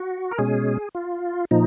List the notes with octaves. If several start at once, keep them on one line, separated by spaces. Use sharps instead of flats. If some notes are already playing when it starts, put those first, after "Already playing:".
Already playing: F#4
A#4
B2 G#3 C#4 G#4
F4
A#2 F3 D#4